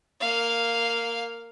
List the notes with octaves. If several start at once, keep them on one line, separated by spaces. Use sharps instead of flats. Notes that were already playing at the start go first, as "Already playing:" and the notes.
A#3 F5